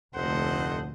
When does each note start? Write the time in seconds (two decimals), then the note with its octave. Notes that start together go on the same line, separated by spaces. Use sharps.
0.15 F1 D2 A#2 A4 C5 D#5 F#5